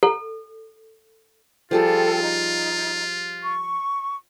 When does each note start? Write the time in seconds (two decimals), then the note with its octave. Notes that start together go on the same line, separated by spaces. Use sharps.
0.03 A4
1.71 F3 G3 F4 G#4 A4 G5
2.22 D#4
3.42 C#6